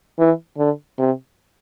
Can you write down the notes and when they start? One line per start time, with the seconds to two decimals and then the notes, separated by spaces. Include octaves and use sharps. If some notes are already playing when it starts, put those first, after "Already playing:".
0.19 E3
0.58 D3
0.98 C3